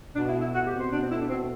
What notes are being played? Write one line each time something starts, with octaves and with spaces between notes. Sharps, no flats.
B2 D4
E4
A3
E4
B2 F#4
G4
C4
C5
B2 D4
C4
A3 E4
D4
B2 C4